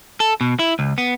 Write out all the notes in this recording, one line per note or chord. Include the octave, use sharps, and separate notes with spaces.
A4
B2
E4
C#2
B3